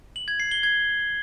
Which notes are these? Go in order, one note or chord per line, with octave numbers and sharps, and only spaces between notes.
F#7
G#6
C7
G7
G#6